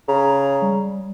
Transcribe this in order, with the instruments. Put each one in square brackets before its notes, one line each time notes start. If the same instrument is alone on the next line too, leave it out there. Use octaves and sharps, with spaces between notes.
[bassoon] C#3 [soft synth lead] A#5
[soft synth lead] G3